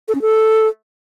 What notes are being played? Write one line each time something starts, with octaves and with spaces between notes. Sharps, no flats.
A4
C#4
A4